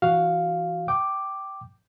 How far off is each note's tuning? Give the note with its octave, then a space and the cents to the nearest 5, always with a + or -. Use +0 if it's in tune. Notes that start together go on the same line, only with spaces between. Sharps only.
E3 +15 F#4 +0 F5 +0
G5 -15 D6 +5